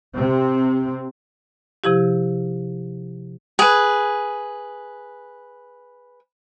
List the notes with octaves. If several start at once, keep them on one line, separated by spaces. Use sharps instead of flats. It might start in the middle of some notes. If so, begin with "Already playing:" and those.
C3 C4
C3 F3 E4 G4
G#4 B4